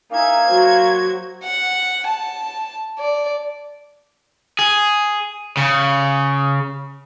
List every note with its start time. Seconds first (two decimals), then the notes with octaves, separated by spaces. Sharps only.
0.12 A#3 D#4 E5 G#5 G#6
0.49 F#3 F#4 C5
1.44 F#5
2.07 A5
2.99 D5
4.59 G#4
5.57 C#3